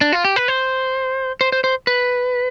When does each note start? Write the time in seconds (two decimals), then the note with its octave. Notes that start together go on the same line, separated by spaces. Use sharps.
0.01 D4
0.12 F4
0.25 G4
0.36 B4
0.48 C5
1.41 C5
1.52 C5
1.64 C5
1.87 B4